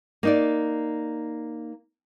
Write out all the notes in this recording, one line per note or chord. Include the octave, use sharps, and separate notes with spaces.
A#3 D#4 D5